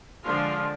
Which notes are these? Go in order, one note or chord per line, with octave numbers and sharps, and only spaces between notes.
D3 F3 G#3 D4 F4